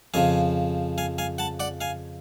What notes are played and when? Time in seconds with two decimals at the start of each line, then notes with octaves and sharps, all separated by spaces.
0.14 F2 C#3 F3 F5 G#5
0.98 F5 G#5
1.18 F5 G#5
1.38 F#5 A5
1.60 D5 F#5
1.81 F5 G#5